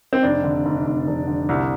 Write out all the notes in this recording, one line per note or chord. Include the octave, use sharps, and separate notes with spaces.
C4
F1 D4
D3
F1
F1
F1
D3
C2